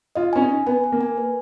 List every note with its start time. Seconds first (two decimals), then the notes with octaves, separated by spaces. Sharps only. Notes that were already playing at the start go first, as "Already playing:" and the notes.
0.15 F4 D#5
0.33 C#4 G#5
0.42 D#4
0.49 G#5
0.67 B3 G#5
0.84 G#5
0.92 A#3
1.01 G#5
1.18 B4